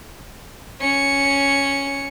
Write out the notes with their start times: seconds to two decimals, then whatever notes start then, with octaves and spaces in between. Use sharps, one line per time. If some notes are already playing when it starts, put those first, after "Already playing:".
0.81 C#4 C#7